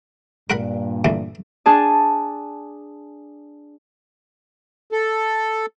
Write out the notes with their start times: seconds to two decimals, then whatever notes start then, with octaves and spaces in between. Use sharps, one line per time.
0.50 G2 A#2 A#4 F#5 B5
1.05 D2 E3
1.66 D4 G#4 A5
4.92 A4